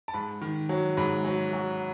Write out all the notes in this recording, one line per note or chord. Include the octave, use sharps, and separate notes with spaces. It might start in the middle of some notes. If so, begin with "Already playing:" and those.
A5
G#2 B5
D#3
F#3
G#2 B5
F#3
F#3